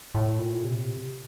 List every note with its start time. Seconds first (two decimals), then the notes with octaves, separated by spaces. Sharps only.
0.14 A2
0.39 A#2
0.64 C3